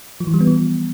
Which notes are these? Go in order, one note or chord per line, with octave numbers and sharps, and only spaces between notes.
F3
E3
G3
B3
F3